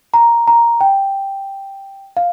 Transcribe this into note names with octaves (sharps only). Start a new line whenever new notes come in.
A#5
A#5
G5
F5